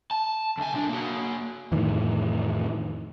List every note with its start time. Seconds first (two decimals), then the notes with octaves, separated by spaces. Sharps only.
0.11 A5
0.58 D2 G#5
0.73 B1 D4
0.89 A#3 F#4
1.72 F2 A2 D#3 E3